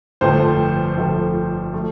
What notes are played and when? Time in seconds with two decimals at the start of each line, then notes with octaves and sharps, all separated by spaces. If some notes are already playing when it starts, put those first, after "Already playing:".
0.21 G1 F2 F3 A3 C5
0.97 G1 F2 F3 A3
1.73 F3 A3